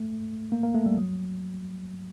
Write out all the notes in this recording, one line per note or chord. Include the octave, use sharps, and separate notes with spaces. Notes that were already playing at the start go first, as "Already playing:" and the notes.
Already playing: A3
A#3
A#3
A3
G3
F#3